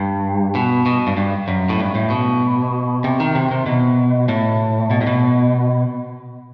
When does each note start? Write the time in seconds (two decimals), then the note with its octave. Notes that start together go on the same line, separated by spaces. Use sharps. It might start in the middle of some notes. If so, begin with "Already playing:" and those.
Already playing: G2
0.55 B2
0.86 B2
1.07 G2
1.17 G2
1.48 F#2
1.69 A2
1.80 G2
1.95 A2
2.10 B2
3.04 C3
3.20 D#3
3.35 C3
3.51 C3
3.66 B2
4.29 A2
4.91 B2
5.01 A2
5.07 B2